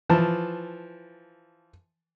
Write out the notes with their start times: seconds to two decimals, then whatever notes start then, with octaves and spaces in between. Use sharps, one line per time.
0.09 E3 F3 A5